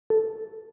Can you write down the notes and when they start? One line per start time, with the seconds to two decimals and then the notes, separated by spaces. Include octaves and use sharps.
0.10 A4